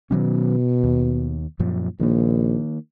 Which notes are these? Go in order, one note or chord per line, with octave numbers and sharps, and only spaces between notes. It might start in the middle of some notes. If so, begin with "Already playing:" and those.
B2 D#3 F#3 C#4
D#2
F#2 A#2 F3
A#1 D#3 A#3